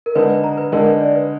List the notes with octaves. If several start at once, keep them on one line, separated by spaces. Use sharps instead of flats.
A#4
D3 G#3 D#4 B4
B4
A#5
B4
D3 G#3 D#4 A#4
B4
D5
B4